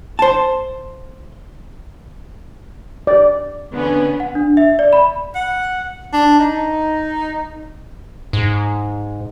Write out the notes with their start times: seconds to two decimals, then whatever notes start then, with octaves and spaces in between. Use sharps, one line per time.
0.19 C5 A5
3.07 D5
3.73 D3 B3 C#4
4.20 F#5
4.35 D4
4.57 E5
4.79 D5
4.93 B5
5.35 F#5
6.13 D4
6.40 D#4
8.33 G#2